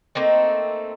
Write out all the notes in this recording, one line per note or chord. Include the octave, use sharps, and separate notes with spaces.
A3 A#3 C4 D#4